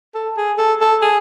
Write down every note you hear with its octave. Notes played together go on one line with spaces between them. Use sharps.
A4
G#4
A4
A4
G#4